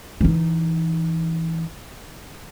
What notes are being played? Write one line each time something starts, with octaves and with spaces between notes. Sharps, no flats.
E3 D#4